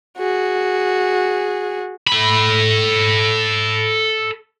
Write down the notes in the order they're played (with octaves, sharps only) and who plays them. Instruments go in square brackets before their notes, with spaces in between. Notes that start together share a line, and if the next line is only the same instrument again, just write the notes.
[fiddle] F#4 G#4
[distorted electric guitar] A4 B5